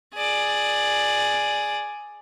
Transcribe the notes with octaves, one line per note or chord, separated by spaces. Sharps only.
G#4 D5